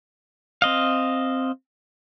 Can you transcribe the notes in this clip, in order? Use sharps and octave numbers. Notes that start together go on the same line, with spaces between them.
C4 D#5 F5